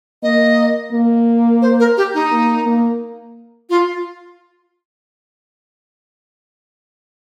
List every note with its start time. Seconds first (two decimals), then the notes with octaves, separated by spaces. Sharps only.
0.23 A#3 D#5
0.92 A#3
1.62 C5
1.80 A#4
1.97 G4
2.14 D#4
2.31 A#3
2.66 A#3
3.70 F4